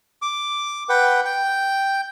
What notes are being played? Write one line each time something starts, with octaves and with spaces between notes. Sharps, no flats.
D6
B4 F#5 G5
G5